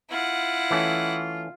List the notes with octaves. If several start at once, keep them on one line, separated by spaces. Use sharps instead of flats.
E4 F4 F#5
E3 A3 C#4